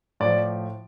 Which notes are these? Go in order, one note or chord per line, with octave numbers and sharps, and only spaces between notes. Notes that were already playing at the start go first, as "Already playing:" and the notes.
A2 F3 D5